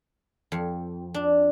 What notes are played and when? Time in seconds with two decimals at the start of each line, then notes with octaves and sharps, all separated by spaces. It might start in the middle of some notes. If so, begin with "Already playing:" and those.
0.52 F2
1.14 D4